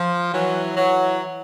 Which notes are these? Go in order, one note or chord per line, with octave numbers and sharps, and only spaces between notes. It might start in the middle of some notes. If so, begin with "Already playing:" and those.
Already playing: F3
E3 F#3
E3 F#3